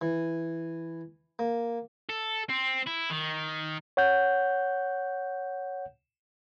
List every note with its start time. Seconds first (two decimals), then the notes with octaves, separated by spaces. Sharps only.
0.01 E3
1.39 A#3
2.09 A4
2.49 C4
2.87 E4
3.10 D#3
3.97 C#5 F#5 G6